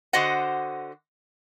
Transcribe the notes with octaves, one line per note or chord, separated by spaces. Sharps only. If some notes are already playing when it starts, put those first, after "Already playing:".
D3 F#4 C5 D#5 F#5